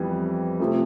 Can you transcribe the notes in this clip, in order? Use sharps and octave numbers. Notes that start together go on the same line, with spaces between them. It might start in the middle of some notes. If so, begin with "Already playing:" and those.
Already playing: F2 E3 G3 B3
C3 F3 A3